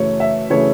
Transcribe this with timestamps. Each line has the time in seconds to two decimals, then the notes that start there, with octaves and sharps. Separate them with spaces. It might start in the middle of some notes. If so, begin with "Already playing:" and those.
Already playing: F#2 C#3 E3 A3 C#5
0.20 E5
0.50 C#3 E3 A3 C#5